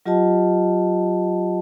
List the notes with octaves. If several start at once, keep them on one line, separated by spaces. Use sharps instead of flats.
F#3 F4 G4 D#5 F#5 A5